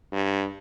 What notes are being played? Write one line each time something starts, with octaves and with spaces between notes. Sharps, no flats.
G2